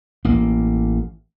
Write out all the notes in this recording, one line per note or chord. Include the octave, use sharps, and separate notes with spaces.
A1 A#3